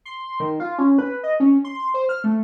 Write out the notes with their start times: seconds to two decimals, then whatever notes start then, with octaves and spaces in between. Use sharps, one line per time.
0.05 C6
0.40 D#3
0.60 F4
0.78 C#4
0.98 B4
1.23 D#5
1.40 C#4
1.65 C6
1.94 C5
2.09 F6
2.24 A3